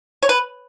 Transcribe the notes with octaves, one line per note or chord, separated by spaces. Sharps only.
C#5
B4